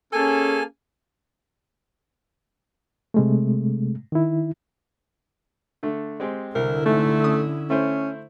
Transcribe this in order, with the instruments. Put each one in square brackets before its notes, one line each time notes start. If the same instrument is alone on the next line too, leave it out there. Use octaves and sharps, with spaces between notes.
[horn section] A#3 G#4 A4 [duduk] C#4 [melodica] G#5
[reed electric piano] C3 G#3 A3
D#3 E4
[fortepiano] D3 A3
G#3 C4 G4
[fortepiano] C2 [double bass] D3 E4 [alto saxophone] A#4
[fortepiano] G#2 C3 [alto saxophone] A3
[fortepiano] C#4 D#6
[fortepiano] A3 E4 C5 [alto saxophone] C#4